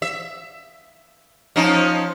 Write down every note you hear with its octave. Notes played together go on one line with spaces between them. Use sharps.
E5
F3 C#4 D#4